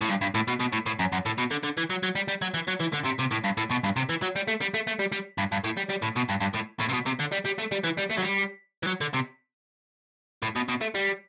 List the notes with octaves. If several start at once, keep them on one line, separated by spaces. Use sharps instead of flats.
A2
G2
G2
A2
B2
B2
A2
A2
F#2
F#2
A2
B2
D3
D3
E3
F#3
F#3
G3
G3
F#3
E3
F#3
E3
D3
C3
C3
A2
G2
A2
B2
G2
C3
E3
F#3
G3
A3
G3
A3
A3
G3
G3
G2
G2
A2
G3
G3
A2
B2
G2
G2
A2
A2
C3
B2
C3
D3
G3
G3
A3
G3
E3
G3
A3
F#3
G3
E3
F#3
D3
C3
A2
B2
B2
A3
G3